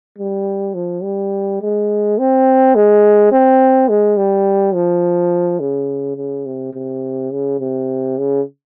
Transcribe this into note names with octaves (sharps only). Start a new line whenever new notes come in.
G3
F3
G3
G#3
C4
G#3
C4
G#3
G3
F3
C#3
C#3
C3
C3
C#3
C3
C#3